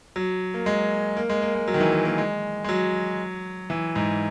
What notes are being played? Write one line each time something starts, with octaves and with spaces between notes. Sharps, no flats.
F#3
A#3
G#3
A#3
G#3
A#3
G#3
F#3
D#3
E3
D#3
A#3
G#3
G#3
F#3
E3
G#2